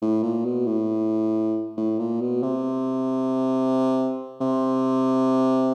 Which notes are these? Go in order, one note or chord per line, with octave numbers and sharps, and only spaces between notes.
A2
A#2
B2
A2
A2
A#2
B2
C3
C3